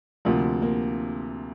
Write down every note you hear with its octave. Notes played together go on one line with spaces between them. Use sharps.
D2 C3 F3 A#3
A#3